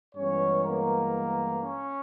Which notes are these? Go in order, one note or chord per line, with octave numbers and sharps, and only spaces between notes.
G2 E3 G#3 B3 C#4 C#5
A#3 A#4
C#4